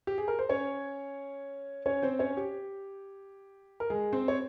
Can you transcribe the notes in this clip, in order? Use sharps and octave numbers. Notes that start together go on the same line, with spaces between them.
G4
G#4
A#4
C5
C#4 C#5
C#4 C#5
C4 C5
C#4 C#5
G4
A#4
G#3 G#4
C4 C5
C#5